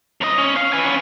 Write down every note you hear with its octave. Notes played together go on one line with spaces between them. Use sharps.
C#2 D#5
C#4
F5
B4 G#5
B3 C#4